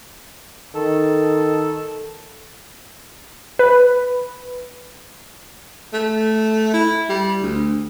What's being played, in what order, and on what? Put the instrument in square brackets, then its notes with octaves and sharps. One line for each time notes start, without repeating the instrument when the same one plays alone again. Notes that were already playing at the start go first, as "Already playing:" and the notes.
[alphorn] D#3 [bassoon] A4
[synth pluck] B4
[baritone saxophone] A3
E4
G3
D2